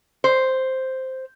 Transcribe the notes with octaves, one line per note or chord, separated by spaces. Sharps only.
C5